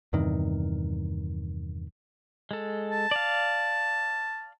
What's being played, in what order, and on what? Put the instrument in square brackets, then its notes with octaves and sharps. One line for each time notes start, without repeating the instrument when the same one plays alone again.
[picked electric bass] E2 G2 C3 D#3
[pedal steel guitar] G#3 A4
[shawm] A5
[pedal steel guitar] D5 F5